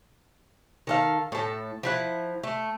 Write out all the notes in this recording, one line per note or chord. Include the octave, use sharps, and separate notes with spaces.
D#3 A4 F5
A2 A4
F3 E4 F#5
A3